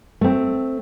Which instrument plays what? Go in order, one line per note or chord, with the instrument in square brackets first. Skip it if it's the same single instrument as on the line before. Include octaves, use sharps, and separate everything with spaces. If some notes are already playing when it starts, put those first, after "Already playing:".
[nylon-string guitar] A3 C4